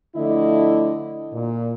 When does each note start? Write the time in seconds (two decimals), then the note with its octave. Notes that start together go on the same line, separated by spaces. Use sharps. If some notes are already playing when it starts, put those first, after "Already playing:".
0.16 D3 F3 A3 E4 D#5
1.33 A#2